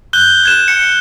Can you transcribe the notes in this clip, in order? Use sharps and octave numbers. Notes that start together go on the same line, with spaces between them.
F#6 G6 G7
F#6 G#6 E7
C#7